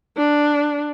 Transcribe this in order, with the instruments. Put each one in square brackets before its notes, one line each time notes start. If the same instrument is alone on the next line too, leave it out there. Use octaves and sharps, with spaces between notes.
[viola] D4